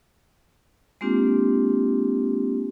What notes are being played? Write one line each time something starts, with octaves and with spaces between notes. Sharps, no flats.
G#3 A#3 C4 D4 F4 G4